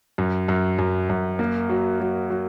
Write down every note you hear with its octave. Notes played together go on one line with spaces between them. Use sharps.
F#2
F#2
F#2
F#2
A#3
F#3
F#3
F#3